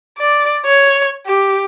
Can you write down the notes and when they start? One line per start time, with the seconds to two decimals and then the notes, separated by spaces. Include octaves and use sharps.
0.18 D5
0.65 C#5
1.26 G4